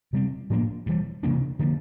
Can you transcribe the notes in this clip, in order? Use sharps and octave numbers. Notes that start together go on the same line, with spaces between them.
C3 G3 C4
A2 F3 A#3 D4
G2 E3 G3
C3 E3 A#3 D4
D3 F3 A#3